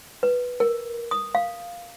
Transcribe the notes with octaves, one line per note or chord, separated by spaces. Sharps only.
B4
A#4
D#6
F5